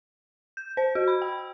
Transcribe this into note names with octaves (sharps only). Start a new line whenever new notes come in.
G6
C5
F#4
B5
G5